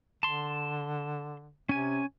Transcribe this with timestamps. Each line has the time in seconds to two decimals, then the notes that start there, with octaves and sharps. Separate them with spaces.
0.23 D3 A5 C6
1.69 C3 C#4 G#5